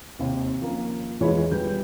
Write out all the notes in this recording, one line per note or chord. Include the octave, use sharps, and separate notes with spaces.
D#2 C3
F3 A#3 C#4
E2 E3 G#3 F4 C#5 B5
G3 B3 G6